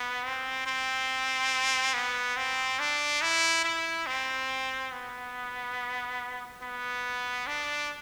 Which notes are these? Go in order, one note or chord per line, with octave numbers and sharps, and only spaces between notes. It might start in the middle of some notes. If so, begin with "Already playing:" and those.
Already playing: B3
C4
C4
B3
C4
D4
E4
E4
C4
B3
B3
D4